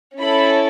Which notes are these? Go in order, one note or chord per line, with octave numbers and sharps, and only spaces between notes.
C#4 E4 A4 B5